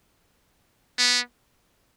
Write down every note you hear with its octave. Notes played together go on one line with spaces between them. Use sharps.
B3